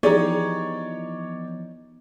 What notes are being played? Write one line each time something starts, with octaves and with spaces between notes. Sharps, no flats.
E3 F3 B3 D#4 G4 G#4 C#5 D5